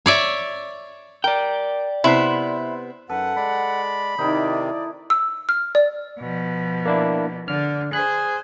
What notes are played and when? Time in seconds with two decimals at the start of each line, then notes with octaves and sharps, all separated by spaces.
0.06 C#5 D5 E5
1.24 A#4 D5 G5
2.04 C3 B3 E4 C5
3.09 F#2 A4 B4 F#5
3.36 G#3 D5 B5
4.18 C3 D#3 D#4 E4 D5
5.10 E6
5.49 F6
5.75 D5
6.19 B2 F3
6.85 A#3 D4 E4
7.48 D3 F6
7.93 G#4 C5 F#6